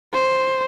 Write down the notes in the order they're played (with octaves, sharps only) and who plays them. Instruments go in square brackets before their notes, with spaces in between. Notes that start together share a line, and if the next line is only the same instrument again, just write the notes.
[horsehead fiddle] C5